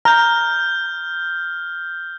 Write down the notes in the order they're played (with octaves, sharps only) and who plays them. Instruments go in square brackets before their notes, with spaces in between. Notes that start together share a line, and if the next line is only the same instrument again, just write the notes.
[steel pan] A#5 [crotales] F6 G6